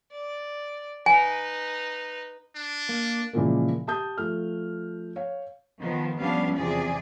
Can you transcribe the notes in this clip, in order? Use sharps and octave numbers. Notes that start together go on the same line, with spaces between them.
D5
D#4 B4 G#5
D4
A#3
A#2 C#3 E3 F3 G#3 A#3
G4 A5 D#6 G6
F3 A3 F6
C#5 F5
D#3 F3 B3
F3 G3 B3 C#4 D4 F5
E2 C3 F3 G#4 D5